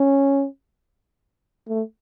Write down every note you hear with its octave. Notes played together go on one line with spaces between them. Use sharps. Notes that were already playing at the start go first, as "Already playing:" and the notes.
Already playing: C#4
A3